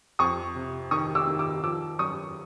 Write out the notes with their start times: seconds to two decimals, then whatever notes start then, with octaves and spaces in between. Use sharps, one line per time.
0.19 F2 C#6 D#6
0.55 C3
0.91 D#3 C#6 D#6
1.15 D6 E6
1.27 D#3
1.39 D6 E6
1.63 F3 D6 E6
1.99 F#2 C#6 D#6